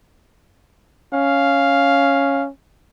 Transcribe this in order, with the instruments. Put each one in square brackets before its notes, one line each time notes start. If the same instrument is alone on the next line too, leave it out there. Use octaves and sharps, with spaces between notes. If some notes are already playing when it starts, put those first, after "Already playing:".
[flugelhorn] C#4 [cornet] F5